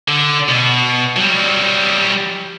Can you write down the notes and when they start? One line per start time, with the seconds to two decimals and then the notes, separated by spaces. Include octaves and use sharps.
0.08 D3
0.48 B2
1.16 F#3 G3